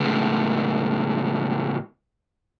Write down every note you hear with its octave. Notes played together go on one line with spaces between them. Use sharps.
C#2 A2